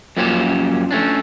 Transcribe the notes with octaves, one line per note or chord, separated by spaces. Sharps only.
F#2 F3 A#3 C#4 G4 C5
A3 C#4 D4